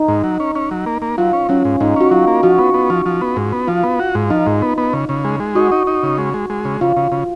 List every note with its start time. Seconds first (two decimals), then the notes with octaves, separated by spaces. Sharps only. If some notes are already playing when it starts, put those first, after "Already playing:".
Already playing: D#4
0.08 G#2
0.24 F#3
0.40 C#4
0.55 C#4
0.71 F#3
0.86 A#3
1.02 A#3
1.18 F#3 F4
1.33 C#4
1.49 F#3 C#4
1.65 G#2
1.80 G#2 D#4
1.96 C#4 F#4
2.11 F#3 F4
2.27 A#3
2.43 F3 F#4
2.58 B3
2.74 B3
2.90 F3
3.06 F3
3.21 B3
3.36 G#2
3.52 B3
3.67 F3 F4
3.83 B3
3.99 F#4
4.15 G#2
4.30 F3 D#4
4.46 G#2
4.62 B3
4.78 B3
4.93 C#3
5.09 C#3
5.25 G#3
5.40 G#3
5.55 D#4 F#4
5.72 D#4
5.87 D#4
6.03 C#3
6.18 G#3
6.34 G#3
6.50 G#3
6.65 C#3
6.81 C#3 F4
6.97 C#3
7.12 C#3